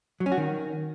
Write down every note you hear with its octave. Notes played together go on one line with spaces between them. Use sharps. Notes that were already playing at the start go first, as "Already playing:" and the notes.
F#3
C#4
F#4
D#3